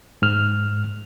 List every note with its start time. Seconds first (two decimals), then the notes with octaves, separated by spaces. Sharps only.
0.22 G#2 F6